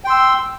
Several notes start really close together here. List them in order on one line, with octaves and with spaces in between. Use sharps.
G5 C6 E6